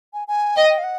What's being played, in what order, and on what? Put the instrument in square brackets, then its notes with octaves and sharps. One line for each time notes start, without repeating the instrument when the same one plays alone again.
[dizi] G#5
G#5
[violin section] D#5 [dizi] G5
[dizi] G5
F5
F#5